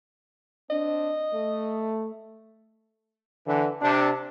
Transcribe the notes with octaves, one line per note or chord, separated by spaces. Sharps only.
C4 D4 D#5
A3
D3 E3
C3 D4